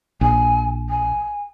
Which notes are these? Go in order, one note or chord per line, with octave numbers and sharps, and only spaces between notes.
A#1 G#5
G#5